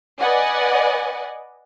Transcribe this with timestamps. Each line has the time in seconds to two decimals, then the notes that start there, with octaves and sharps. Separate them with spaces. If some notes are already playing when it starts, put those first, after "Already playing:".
0.18 B4 D5 D#5 F#5 G#5